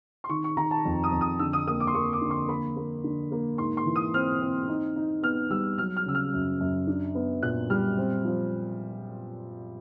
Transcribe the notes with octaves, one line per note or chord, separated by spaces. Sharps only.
C6
D#3 C#6
C#6
D#3 A#5
A5
F2
D#6
F2
D#6
D3 E6
D#6
A#3 D#6
D6
C6
A#3 C#6
D6
D3
C6
A#3 B5
A#3
D3
A#3
G#2 C6
C6
E3
D#6
C4 F6
C4
D#4
D#4
B3 F6
G3 E6
F#3 F6
F6
C#3 E6
F6
F#2
F#2
D4
B3
A#2 F#6
G3 F6
C4
F3